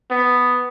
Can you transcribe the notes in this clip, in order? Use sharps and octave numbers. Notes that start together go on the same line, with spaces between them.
B3